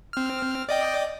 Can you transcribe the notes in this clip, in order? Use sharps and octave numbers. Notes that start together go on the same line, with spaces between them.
C4 F6
D5 D#5 G5